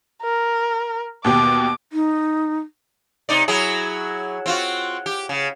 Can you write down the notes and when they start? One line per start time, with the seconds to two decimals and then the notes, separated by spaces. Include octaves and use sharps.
0.22 A#4
1.24 D#2 B2 G4 D6
1.93 D#4
3.29 C3 D#4 D5
3.48 F#3 E4 G#4
4.46 C4 F4 F#4
5.06 G4
5.29 C#3